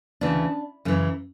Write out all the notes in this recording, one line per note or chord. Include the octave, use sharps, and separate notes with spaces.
D2 C#3 E3 D4
F#2 C#3 E3